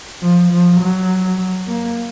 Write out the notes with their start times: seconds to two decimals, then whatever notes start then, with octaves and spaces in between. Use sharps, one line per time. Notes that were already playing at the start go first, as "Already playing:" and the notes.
0.22 F3
0.52 F3
0.80 F#3
1.68 A#3